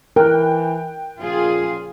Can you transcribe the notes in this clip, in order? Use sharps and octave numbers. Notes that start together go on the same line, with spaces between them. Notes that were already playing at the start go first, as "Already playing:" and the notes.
E3 A#4 G5 F#6
A#2 C#3 F3 F4 G#4